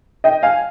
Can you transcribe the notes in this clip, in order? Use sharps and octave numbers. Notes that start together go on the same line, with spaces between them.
D#5 G5
F5 G#5